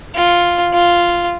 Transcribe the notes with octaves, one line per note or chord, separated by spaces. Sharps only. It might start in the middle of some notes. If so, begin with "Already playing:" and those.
F4
F4